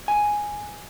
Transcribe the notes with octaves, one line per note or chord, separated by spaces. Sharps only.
G#5